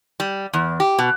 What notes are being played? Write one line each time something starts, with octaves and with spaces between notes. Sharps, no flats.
G3
E2
G4
B2